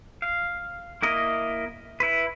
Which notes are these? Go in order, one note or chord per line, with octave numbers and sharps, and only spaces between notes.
F5
A#3 E4 A#4 D#5
E4 B4